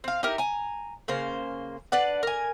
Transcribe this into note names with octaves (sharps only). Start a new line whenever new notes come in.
C4 F5
D#4 E4 G4 A#4
G#5 A#5
C#3 A#3 C5
D4 B4 D5 F#5
A#4 G#5